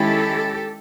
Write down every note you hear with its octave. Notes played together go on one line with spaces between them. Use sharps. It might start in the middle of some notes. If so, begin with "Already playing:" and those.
Already playing: D#3 G#3 C#4 E4 G4 A4